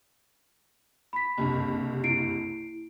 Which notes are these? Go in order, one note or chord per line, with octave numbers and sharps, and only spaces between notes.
B5 B6
F#1 C2 G2
E4 C7 D7